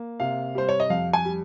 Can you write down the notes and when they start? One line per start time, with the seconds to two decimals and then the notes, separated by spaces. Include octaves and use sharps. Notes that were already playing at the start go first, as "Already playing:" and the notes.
Already playing: A#3
0.20 C3 F5
0.55 G3 C5
0.69 C#5
0.80 D#5
0.90 F2 F5
1.13 G#5
1.25 G3